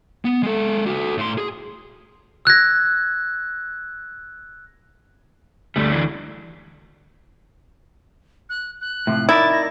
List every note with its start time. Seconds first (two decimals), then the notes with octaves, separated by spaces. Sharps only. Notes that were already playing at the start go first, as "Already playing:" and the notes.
0.25 B3
0.43 G#3 A4
0.86 F#4 A4
1.18 A2 C6
1.38 G#4
2.45 E6 F#6 G#6 A#6
5.76 D2 G3 A3
5.92 E3 D4
8.50 F#6
8.81 F#6
9.07 A2 C3 F3
9.29 D#4 E4 A#4 D5 A6
9.52 A#6